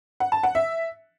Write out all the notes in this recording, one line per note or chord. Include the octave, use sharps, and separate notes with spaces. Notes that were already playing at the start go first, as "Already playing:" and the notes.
F#5
A5
F#5
E5